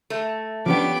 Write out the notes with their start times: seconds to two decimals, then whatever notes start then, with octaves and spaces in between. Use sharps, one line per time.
0.10 A3 E5
0.66 F3 B3 C#4 D4 F4 G4 G5 D6